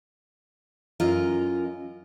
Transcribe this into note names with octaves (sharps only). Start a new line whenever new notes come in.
F#2 F4 A#4 D#5